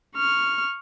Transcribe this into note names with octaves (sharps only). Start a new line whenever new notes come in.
C#6 F6